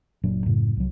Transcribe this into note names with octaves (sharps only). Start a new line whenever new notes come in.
F#1 A#2 F#3 D4
F#2 A2 C#3
C2 F#3